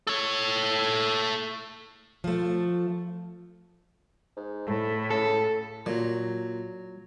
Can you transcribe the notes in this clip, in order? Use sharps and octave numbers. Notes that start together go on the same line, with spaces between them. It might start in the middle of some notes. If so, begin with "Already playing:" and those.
A4 C#5
F3 A3
G#2
A2 A3
C#3 A4
A#2 F#3